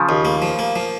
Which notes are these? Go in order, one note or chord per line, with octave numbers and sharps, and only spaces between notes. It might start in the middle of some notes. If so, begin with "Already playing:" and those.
Already playing: C#3 F3
D#2
A#3
F3
A#3
F3